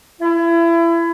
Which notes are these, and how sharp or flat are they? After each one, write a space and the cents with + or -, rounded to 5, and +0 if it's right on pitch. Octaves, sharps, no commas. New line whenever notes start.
E4 +30